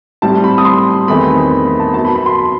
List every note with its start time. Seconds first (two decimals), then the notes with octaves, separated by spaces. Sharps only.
0.22 A2 G3 C4 A5
0.44 B5
0.58 D#6
0.65 C6
1.08 E2 D#3 A3 C4 B5
1.51 B5
1.66 B5
1.80 A5
1.94 F#2 F#3 B3 A5
2.05 B5
2.16 B5
2.26 C6